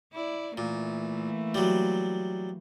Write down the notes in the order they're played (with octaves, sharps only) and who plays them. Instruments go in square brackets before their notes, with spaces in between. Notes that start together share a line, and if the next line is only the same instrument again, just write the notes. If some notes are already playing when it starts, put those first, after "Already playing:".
[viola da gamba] E4 D5
[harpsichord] A#2 [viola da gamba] E3 A3 A#3
[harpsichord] F#3 G3